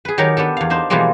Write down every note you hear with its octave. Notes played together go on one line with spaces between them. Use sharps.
G#4 B4
D#3 F#3 D#4 G4 A#4 C#5
B3 D4 G4 A4
E2 F5
D4 D#4 C5
B2 E3 F3 G3 G#3 A#3